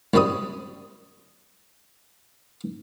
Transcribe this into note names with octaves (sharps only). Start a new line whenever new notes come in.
C2 F#2 G3 C4 D#6